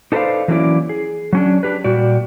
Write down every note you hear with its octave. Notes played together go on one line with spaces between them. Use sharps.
D#4 A4 B4 C5 D5 F5
E3 F#3 A#3 C#4 E4 D5
G#4
F#3 C#4 D4
D4 G4 B4
A#2 G3 F#4 D5